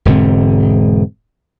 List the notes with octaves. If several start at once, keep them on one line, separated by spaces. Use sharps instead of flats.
E1 G#2 D3 C4